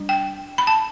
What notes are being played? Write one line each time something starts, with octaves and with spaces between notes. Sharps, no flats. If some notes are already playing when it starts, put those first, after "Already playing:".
Already playing: G3 D4
G5
B5
A5